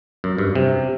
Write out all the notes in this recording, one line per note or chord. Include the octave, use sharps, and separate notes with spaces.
F#2
G2
C3